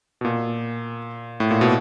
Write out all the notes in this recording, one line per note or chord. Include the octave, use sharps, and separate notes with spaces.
B2
A#2
A2
A#2
B2